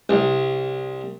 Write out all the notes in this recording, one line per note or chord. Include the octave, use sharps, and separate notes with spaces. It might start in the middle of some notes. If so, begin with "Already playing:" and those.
C2